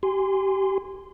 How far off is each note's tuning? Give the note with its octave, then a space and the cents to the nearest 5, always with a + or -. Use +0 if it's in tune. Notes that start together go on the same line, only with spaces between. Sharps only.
G4 -25 G#5 -25 C6 -20